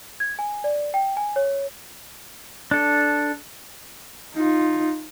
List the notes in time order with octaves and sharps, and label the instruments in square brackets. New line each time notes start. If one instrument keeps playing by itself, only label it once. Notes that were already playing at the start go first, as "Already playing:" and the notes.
[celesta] G#6
G#5
D5
G5
G#5
C#5
[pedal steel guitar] D4 A4
[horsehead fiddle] D#4 F4